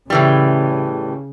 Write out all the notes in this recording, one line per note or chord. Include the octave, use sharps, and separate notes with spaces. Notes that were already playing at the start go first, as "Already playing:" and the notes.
A2 C#3 E3 G3